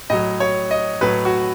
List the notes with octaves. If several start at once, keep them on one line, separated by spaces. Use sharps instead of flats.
A2 F#3 D#5
C#5
D#5
A2 F#3 B4
F#4